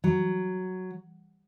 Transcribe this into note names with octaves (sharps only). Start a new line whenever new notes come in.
F#3